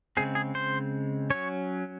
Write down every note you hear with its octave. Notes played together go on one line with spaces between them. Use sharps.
C#3 G#3 C4 G#4
G#4
C5
F#3 C#4 C#5